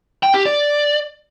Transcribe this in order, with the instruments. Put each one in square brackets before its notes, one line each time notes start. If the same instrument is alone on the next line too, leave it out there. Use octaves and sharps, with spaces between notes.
[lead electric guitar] G5
G4
D5